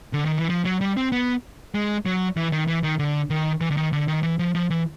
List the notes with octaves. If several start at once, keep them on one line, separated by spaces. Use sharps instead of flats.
D3
D#3
E3
F3
F#3
G3
C4
B3
G#3
F#3
E3
D#3
E3
D#3
D3
D#3
E3
D3
D#3
D3
D#3
E3
F3
F3
E3